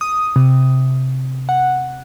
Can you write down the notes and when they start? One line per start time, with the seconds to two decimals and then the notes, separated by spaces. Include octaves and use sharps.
0.01 D#6
0.36 C3
1.49 F#5